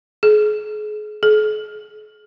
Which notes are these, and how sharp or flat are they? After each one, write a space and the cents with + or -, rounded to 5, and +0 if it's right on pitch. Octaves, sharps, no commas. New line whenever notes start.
G#4 +35
G#4 +45